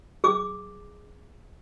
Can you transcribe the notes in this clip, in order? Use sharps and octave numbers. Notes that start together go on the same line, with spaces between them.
G#4 D6